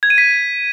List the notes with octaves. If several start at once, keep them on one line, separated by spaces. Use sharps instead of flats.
G#6
D#7
B6